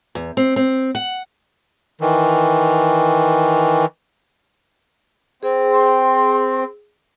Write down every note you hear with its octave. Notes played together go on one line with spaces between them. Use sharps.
E2
C4
C4
F#5
D#3 E3
C4 G#4
C6